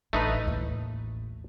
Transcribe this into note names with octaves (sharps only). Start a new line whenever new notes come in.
A1 A3 D#4 B4
A1 D#2